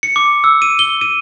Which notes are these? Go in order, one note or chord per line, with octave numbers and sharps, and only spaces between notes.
C#7
D6
E6
D#7
G7
D#7